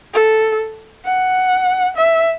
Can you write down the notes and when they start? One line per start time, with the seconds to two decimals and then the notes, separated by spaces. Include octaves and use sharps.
0.14 A4
1.05 F#5
1.96 E5